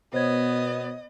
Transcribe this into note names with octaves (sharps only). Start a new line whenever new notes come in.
B2 B3 C5 C#5 D#5 G#6